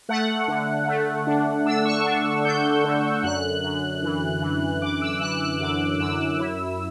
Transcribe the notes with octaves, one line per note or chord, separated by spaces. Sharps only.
A3 F#5
D3
A3
D4
D4 E6
C#6
D4
D4 G6
D3
F#2 F#6
F#2
E3
E3
E3 D6
E6
E3 F#6
F#6
F#2 D6
F#2 E6
E4